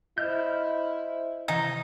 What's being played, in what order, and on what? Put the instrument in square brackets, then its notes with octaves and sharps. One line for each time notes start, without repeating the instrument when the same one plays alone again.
[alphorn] E4 [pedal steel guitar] C5 F6 G6 [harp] D#5 F5
[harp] C3 D#3 E3 [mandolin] D#4